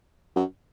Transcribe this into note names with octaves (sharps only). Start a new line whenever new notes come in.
F#2